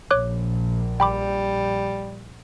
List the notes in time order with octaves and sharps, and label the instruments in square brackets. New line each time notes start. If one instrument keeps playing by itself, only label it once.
[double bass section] A#1 [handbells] C#5 D6 F#6
[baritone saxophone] G3 [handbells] G5 B5 D6